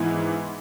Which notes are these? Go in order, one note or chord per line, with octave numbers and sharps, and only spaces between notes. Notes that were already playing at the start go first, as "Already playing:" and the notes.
Already playing: G#2 E3 B3 E4